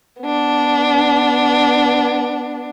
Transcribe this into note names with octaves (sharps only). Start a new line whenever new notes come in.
B3 D4